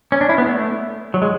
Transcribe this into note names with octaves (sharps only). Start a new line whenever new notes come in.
C#4
D4
E4
B3
A3
F#3
G#3